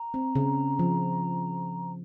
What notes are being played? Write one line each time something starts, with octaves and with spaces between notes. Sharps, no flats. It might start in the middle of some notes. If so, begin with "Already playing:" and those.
Already playing: A#5
C4
C#3
F3